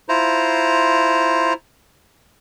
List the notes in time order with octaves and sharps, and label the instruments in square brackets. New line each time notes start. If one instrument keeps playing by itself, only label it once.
[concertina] E4 F4 C5 A#5